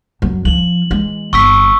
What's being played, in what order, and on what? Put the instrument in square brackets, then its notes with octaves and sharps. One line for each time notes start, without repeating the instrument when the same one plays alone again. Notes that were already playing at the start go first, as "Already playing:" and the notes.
[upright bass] F#2 F#3
[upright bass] F3 C#4 [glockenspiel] F#7
[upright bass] E3 G#3
[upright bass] G1 [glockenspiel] C#6 E6 B6